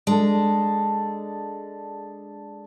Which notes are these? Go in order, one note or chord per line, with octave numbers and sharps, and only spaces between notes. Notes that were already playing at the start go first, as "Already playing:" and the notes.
G#3 D4 A4